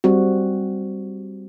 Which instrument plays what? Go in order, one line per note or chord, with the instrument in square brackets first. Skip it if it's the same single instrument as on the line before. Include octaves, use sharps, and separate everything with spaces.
[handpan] G3 C4 F#4